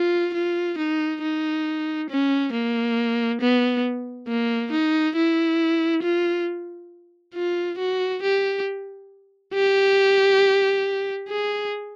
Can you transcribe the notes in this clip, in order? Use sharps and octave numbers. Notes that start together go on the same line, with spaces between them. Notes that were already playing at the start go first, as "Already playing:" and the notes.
Already playing: F4
F4
D#4
D#4
C#4
A#3
B3
A#3
D#4
E4
F4
F4
F#4
G4
G4
G#4